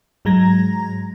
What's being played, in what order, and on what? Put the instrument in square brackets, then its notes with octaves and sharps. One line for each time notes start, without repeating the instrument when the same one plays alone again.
[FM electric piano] G#2 F#3 G#3 A#5 G#6 A#6